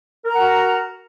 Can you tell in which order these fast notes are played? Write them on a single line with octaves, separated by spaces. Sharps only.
A#4 A#5 F#5 F#4